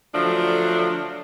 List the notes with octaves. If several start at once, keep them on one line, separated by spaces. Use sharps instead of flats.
D3 F3 F#3 A3 D4